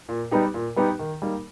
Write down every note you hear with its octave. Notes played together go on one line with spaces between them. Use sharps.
A#2
G3 B3 D#4 G4
A#2
G3 B3 D#4 G4
D#3
G3 A#3 D#4